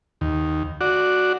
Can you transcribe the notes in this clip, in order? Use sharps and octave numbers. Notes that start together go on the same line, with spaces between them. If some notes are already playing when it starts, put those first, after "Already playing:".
D#2
F#4 D5